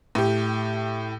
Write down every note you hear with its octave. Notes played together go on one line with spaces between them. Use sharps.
A2 G4